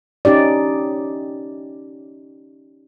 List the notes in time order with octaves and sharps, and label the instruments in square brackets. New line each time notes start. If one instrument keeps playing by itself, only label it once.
[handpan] C#4 D#4 G4 D5